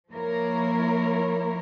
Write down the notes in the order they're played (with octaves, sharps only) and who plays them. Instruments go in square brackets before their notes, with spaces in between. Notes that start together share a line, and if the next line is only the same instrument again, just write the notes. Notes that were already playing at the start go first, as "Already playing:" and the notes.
[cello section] F3 A#3 E4 A#4 C#5